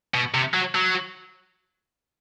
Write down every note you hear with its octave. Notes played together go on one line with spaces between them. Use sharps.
B2
C3
F#3
F#3